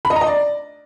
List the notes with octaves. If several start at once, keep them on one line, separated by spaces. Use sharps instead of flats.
B5
D#5
A#5
D#5
D5